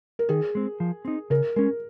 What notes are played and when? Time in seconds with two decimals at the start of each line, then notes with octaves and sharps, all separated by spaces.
0.19 A#4
0.29 D#3 G#4
0.55 G#3 C4
0.80 F3
1.05 C4 D#4
1.30 C#3 A#4
1.56 G#3 C#4 A#4